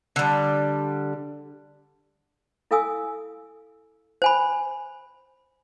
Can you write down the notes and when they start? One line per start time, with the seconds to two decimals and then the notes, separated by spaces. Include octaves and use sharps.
0.16 D3 G3
2.71 E4 A4 F5 G#5 D#6 E6
4.22 C5 G#5 B5